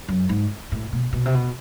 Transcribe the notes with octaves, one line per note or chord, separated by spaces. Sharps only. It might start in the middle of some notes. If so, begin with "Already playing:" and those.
F#2
G#2
A2
B2
B2
C3
B2